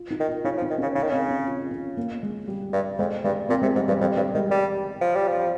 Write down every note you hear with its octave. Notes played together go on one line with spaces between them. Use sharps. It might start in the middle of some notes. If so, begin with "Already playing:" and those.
Already playing: F4
D#4
D#3
F4
C#3 D#4
F3
D#4
D#3
C#3 C#4
C#3 D#4
D#3
C#3 C4
C#4
F4
C#4
A#3
G#3
G3
G2
F2 G#3
G2 G#3
A#2 C4
C3 G#3
G#2 G3
G2 G3
F2 G3
G2 G3
D#3 G#3
G3
F3
G3
F3